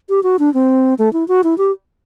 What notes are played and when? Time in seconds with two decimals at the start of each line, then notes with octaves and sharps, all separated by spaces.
0.09 G4
0.23 F#4
0.39 D4
0.54 C4
0.99 A3
1.13 E4
1.28 F#4
1.44 E4
1.58 G4